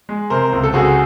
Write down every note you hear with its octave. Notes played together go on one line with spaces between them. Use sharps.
G#3
C3 A#4 C5
C#2
A4
C#2 F#4 G#4